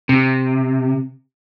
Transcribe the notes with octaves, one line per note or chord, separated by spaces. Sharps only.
C3